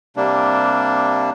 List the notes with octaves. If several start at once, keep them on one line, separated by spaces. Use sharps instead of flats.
C3 G3 A#3 D4